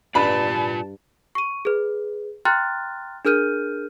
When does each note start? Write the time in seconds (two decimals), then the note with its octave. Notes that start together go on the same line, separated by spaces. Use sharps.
0.15 G2 F4 B4 D5 A5 B5
1.35 C#6 D#7
1.65 G#4 B4
2.45 G5 A#5 C6 F6 F#6 A6
3.25 D4 G#4 A#4 F6 G6 D#7